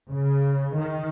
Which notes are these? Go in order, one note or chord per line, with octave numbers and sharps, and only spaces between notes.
C#3
D#3